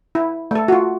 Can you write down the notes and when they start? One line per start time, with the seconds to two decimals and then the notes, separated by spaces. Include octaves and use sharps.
0.15 E4
0.51 A3 A4
0.68 F4 F#4